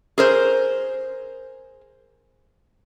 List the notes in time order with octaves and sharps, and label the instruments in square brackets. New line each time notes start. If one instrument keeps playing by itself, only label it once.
[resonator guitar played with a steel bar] G#4 A#4 C5